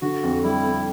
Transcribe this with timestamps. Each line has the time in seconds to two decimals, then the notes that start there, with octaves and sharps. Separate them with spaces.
0.01 D3 F#4
0.23 F2
0.44 G3 E4
0.64 F2